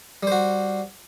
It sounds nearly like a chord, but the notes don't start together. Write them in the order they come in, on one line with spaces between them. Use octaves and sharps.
G3 C5 F#4